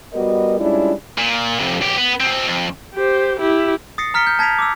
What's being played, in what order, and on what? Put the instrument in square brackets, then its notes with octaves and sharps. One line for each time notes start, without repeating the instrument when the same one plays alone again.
[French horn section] G3 B3 F#4 A#4 D#5
G3 G#3 C#4 D4 E4 F4
[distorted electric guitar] A#2
F2 C3
B1 G4
B3
B2 C4
F2
[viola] G4 C5
E4 G4
[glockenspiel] D#6 A6 A#6 C7 C#7
A#5 F6 B6 C#7 D7 G7
G6
A5 G#6 A#6 B6 D7 F7
D6 E6